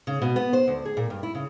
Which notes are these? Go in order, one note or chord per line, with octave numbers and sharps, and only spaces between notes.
C#3
B2
B3
C5
D2
G#4
A#2
G2
E4
C#3